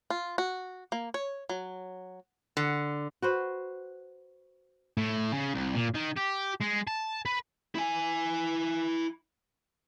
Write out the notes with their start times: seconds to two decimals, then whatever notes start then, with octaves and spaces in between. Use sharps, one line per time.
0.10 F4
0.38 F#4
0.92 A#3
1.14 C#5
1.49 F#3
2.57 D3
3.22 F#4 B4 C5
4.97 A2
5.33 C#3
5.54 C2
5.75 A#2
5.95 D#3
6.17 G4
6.61 G#3
6.88 A5
7.26 B4
7.75 E4 G#5